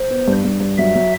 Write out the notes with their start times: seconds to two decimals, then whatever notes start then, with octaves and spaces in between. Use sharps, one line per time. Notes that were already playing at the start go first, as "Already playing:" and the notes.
Already playing: C5
0.10 B3
0.28 G2
0.45 G2
0.60 G2
0.78 F#3 E5
0.95 F#3